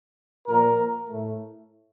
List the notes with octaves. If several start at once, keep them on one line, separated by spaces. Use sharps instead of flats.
A#2 F3 A#3 A#4
A2 A3